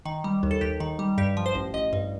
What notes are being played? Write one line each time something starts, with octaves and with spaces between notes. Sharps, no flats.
D#3
G3
D#2
A4
D#2 G4
D#3
G3
G2 G4
F3
C5
A1
A1 D#5
G2